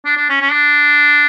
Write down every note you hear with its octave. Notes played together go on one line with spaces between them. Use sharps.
D4
D4
C#4
C#4
D4